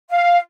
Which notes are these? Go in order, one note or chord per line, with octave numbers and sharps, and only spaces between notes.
F5